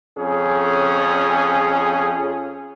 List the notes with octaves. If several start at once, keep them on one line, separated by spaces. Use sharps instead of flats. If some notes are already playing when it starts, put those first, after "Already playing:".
F2 C#4 G#4